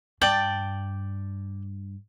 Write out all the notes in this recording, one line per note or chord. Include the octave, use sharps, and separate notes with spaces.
G2 D5 G5 A5